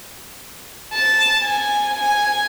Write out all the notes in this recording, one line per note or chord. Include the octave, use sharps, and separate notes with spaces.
A5
G#5
G#5